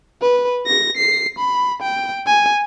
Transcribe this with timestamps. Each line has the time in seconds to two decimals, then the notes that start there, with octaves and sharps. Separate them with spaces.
0.22 B4
0.67 A#6
0.97 C7
1.39 B5
1.83 G5
2.27 G#5